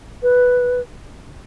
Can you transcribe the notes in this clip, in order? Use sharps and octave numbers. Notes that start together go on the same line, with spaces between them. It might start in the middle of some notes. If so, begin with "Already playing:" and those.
B4